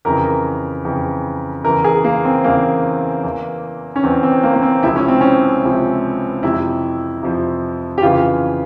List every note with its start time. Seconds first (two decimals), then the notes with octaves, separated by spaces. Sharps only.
0.05 F2 C#3 E3 A#4
0.85 F2 C#3 E3
1.64 E2 C#3 E3 A#4
1.84 G#4
2.04 A#3
2.25 C4
2.44 E2 C#3 E3 A#3
3.23 E2 E3
3.96 C#4
4.03 E2 E3 C4
4.23 C4
4.43 A#3
4.55 A#3
4.63 C4
4.83 C#2 C3 F3 E4
4.96 C#4
5.08 C4
5.21 C#4
5.63 C#2 C3 F3
6.43 F2 C3 F3 E4
7.23 F2 C3 F3
7.98 G4
8.02 F2 C#3 E3 F4